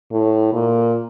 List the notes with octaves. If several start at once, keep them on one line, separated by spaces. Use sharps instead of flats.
A2
A#2